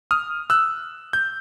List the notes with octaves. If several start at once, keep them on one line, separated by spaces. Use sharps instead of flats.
D#6 F6
E6 F#6
G6